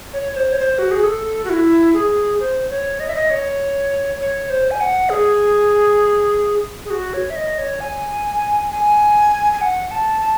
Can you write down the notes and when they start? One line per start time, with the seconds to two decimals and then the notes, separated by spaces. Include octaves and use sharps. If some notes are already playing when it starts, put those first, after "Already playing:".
0.14 C#5
0.33 C#5
0.37 C5
0.53 C#5
0.59 C5
0.79 F#4
0.91 G#4
1.04 A4
1.45 F#4
1.50 E4
1.94 G#4
2.39 C5
2.70 C#5
3.00 D#5
3.08 E5
3.15 D#5
3.30 C#5
4.20 C#5
4.50 C5
4.71 G#5
4.80 F#5
5.10 G#4
6.85 G#4
6.90 F#4
7.14 C#5
7.30 E5
7.36 D#5
7.58 C#5
7.80 G#5
8.71 G#5
9.53 G#5
9.61 F#5
9.91 A5
10.21 A5